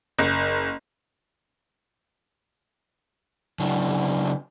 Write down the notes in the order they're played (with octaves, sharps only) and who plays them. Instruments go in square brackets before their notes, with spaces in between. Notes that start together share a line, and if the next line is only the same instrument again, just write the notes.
[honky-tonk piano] F#1
[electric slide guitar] C#3 F#3 D4 E4